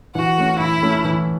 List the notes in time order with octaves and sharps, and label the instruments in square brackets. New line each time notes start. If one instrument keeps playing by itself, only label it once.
[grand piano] E3 [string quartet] F#4
[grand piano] A3 C#4
[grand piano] E3 [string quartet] E4
[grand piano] A3 C#4
E3